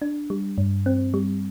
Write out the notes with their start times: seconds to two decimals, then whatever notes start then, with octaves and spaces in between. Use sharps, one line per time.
0.02 D4
0.30 G3
0.58 G2
0.86 C4
1.14 G3